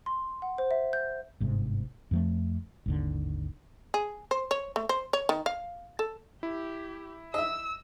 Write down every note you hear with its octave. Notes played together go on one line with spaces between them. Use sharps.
C6
F#5
C5
E5
G6
G1 G#2 C3
F2 F3 A3
G#1 D#2 D3
G#4
C5
C#5
A3
C5
C#5
D#3
F5
A4
E4 G4
D#5 E5 E6